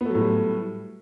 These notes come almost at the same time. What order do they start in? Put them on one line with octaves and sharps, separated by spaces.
B3 A3 F#3 A2 G3